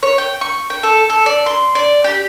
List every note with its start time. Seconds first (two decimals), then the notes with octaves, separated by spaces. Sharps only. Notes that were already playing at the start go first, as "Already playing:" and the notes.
0.03 C#5
0.18 G5
0.41 C#6
0.70 G5
0.83 A4
1.10 A4
1.26 D5
1.46 C6
1.75 D5
2.04 G4